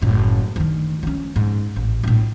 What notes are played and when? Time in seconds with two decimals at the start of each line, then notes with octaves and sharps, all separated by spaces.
0.02 F#1 A2
0.56 D2 D#3
1.03 F3 C#4
1.36 G#2
1.76 A1
2.03 A#1 A2